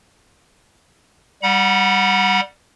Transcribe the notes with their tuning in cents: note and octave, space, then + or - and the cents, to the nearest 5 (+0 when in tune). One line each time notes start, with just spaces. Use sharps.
G3 +0 F#5 -15 B5 -45